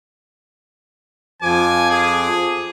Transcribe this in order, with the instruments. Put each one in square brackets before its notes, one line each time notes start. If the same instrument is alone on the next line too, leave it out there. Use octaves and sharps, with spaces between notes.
[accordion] F2 F3 D6 [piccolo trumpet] G#5
[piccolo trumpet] G#4